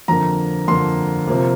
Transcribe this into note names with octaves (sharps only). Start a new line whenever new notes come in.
F2 D3 A#3 A#5
F2 D3 A#3 C6
C3 F3 A#3